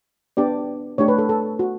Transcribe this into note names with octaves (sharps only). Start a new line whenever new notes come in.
B3 D4 G4 D5
A3 D4 G4 C#5
B4
A4
A4
F#4